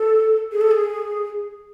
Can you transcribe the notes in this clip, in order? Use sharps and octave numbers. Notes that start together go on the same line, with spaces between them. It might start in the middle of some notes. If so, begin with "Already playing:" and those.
Already playing: A4
G#4
A4
G#4